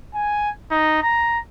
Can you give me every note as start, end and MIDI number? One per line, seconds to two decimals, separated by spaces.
0.14 0.50 80
0.71 0.99 63
1.03 1.39 82